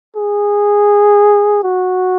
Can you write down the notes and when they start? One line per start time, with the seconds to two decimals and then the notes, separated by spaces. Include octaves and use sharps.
0.16 G#4
1.63 F#4